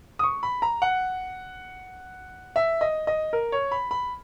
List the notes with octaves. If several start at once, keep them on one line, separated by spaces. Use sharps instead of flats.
D#6
C#6
B5
A#5
F#5
E5
D#5
D#5
A#4
C#5
B5
B5